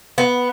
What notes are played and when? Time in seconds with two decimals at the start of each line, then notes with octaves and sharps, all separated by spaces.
0.18 B3